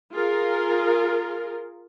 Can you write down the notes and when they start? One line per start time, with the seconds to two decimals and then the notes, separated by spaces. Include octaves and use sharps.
0.13 F4 G#4 A#4